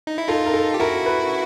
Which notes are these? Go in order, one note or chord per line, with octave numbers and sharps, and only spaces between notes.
D#4
E4
D#4 F4 A4
A#4
A4
G4
E4 F#4 A#4
B4